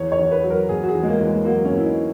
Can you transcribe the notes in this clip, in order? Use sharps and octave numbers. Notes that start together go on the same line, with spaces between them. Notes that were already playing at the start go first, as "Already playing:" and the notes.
Already playing: E2 C#5
C#5
E2
B4
F#3
A#4
B2 G#4
F#4
G#4
E2
G#3
A#3
E2
G#3
F#3 A#3
C#4
B2
E4
D#4